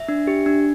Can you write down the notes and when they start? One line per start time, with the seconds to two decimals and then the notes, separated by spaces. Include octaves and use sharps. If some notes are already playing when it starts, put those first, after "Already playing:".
Already playing: E5
0.08 D4
0.27 G4
0.46 D4